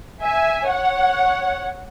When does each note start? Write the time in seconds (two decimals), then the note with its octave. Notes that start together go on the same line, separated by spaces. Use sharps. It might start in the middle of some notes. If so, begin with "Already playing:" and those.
0.24 E5 G#5
0.68 C#5 F#5